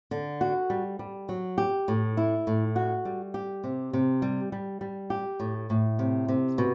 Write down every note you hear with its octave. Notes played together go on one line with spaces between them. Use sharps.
D3
F#4
G3
G3
F#3
G4
A2
E4
A2
F#4
G3
G4
C3
C3
G3
G3
G3
G4
A2
A2
C3
C3
B2